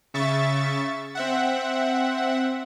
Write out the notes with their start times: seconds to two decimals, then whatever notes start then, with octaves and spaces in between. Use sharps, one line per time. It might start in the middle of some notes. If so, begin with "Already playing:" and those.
0.14 C#3 E5 C#6 A6
1.15 C4 E5 F#5